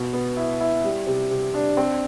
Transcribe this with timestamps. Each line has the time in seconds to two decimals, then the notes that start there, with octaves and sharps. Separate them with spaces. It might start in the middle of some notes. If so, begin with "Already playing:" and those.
Already playing: B2
0.13 B3
0.37 E4
0.60 E4
0.84 G3
1.07 C3
1.31 C3
1.54 D4
1.77 C4